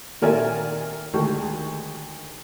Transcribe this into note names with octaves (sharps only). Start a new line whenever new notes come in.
A#2 D#3 A#4 D5 E5 G#5
D2 D#3 G#3 C#6